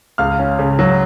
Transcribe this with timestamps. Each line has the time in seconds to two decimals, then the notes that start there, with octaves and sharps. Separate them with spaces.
0.18 C#2 F5 F6
0.39 C#4
0.59 C#3
0.79 F#3